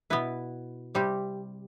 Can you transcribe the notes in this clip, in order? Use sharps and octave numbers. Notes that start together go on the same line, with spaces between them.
B2 B3 E4 B4
C3 G3 C4 G4